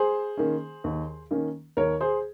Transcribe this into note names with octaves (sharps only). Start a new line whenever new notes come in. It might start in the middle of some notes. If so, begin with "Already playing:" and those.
Already playing: G#4 C5
D#3 A#3 C#4
D#2
D#3 A#3 C#4
D#2 A#4 C#5
G#4 C5